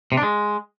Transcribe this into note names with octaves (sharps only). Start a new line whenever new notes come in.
C3
D4
G#3